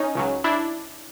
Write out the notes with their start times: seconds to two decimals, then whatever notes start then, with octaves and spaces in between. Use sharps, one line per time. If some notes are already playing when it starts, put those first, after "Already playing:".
Already playing: C#4 D#4
0.15 C#2 C#3 F#3
0.44 D4 E4